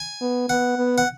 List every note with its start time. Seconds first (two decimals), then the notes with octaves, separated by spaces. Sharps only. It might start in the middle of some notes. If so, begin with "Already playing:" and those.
Already playing: G#5
0.21 B3
0.49 B3 F#5
0.78 B3
0.98 F#5